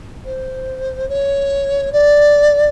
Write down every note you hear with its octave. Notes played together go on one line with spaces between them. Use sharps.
C5
C#5
D5